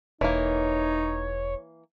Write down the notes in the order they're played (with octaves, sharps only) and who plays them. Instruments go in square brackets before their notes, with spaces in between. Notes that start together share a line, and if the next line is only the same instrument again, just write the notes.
[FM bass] E1 [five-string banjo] E3 A#3 [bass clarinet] D#4 [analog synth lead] C#5